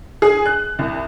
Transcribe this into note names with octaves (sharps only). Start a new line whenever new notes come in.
G#4
F#6
C2